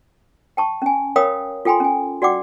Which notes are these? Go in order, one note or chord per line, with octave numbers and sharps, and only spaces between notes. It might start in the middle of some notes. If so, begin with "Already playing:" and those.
G5 A5 C#6
C#4 G#5
A#4 C#5 F5 G5 B5 D#6
F4 A4 G5 G#5 B5 C6
C#4 G#5
F#4 D5 F#5 G5 D6